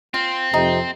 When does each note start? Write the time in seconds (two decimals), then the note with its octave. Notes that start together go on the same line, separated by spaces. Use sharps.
0.14 C4 F4
0.54 F2 C3 D#4